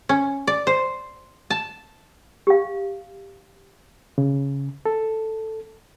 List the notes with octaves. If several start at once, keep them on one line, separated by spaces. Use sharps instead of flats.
C#4
D5
C5
A5
G4 F5
C#3
A4